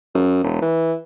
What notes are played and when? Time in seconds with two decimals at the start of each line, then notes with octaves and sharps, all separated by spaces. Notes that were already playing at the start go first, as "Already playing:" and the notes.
0.15 F#2
0.43 E1
0.62 E3